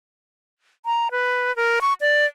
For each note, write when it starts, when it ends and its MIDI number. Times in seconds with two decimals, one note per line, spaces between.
0.86 1.08 82
1.11 1.54 71
1.56 1.79 70
1.81 1.93 85
2.01 2.25 74